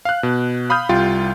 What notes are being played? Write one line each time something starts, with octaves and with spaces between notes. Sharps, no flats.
F5 F#6
B2
F5 B5 D#6 F6 G6
C2 G3 F4 G5 C6 A6